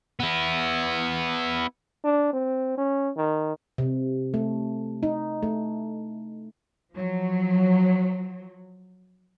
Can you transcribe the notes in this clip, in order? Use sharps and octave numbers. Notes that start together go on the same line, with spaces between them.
B3 E4
D4
C4
C#4
D#3
C3
A3
D#4
A3
F3 F#3